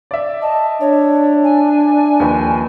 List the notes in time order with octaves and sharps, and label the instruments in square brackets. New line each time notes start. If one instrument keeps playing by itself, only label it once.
[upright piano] D5 E5
[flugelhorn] D#5 [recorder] A5
[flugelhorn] D4 [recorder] C#5
[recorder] G#5
[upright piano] D#2 F3 B4